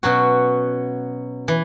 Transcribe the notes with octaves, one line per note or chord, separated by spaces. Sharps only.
B2 F#3 C#4 F#4
E3